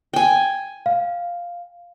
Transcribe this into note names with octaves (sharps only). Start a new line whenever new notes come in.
G5 G#5
F5